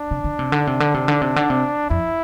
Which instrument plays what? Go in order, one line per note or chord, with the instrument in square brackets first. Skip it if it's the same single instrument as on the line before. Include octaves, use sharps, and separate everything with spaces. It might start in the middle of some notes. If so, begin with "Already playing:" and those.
Already playing: [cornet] D4
[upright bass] C3
D3
C3
D3
C3
D3
C3
D3
C3
D3
C3
[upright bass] F2 [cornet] E4